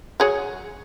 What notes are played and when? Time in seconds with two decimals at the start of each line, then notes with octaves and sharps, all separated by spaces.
0.20 F#3 G#4 C#5